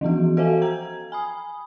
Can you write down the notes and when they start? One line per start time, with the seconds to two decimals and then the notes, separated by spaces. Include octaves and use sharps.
0.01 E3 F3 B3 F#4
0.37 F#4 A4 C5 E5 F5 G#5
0.62 G5 A#5 G#6
1.12 G#5 B5 D#6